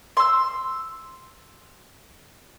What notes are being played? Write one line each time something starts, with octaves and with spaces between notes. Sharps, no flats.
C6 E6